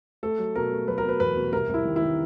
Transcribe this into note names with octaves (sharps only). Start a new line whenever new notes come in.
A3 A4
F#3
B2 A#4
A3
F#3 B4
A#4
B2 B4
E2 B4
B2
C2 A#4
C2 E4
D#3
E4
D#3